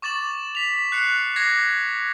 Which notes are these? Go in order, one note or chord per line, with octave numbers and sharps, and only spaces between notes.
C#6 D6 A6 E7 F#7
B6 F7
F#6 C7 C#7
D6 G#6 A#6 C7